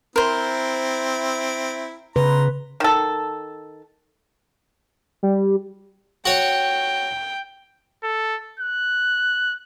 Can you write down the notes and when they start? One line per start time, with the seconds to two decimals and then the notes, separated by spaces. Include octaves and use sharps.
0.16 C4 E4 A#4 C5
2.16 C#3 B4 A#5 C6
2.80 D#3 A4
5.23 G3
6.26 F#4 C#5 G5
8.03 A4
8.59 F#6